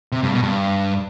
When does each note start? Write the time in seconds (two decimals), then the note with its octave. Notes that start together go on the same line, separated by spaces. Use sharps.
0.12 C3
0.22 G2
0.32 B2
0.42 G2